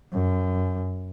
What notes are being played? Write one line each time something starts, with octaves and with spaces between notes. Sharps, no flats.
F#2